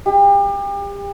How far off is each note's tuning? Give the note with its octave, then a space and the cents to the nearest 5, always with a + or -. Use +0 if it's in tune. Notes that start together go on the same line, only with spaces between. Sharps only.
G4 +35